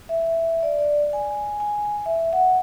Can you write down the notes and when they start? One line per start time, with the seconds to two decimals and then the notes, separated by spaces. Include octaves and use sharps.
0.09 E5
0.63 D5
0.79 D5
1.13 G#5
1.60 G#5
2.06 E5
2.33 F#5